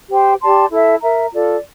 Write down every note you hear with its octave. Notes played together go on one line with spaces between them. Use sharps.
G4 C5 G5
G4 D5 A5 C6
E4 A4 E5
A#4 E5 A#5
F4 A4 D5